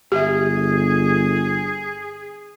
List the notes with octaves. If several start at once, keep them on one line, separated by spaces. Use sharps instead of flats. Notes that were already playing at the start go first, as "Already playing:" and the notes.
G1 G4 G#4 E5